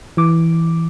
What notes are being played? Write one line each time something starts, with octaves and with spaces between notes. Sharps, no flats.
E3 D6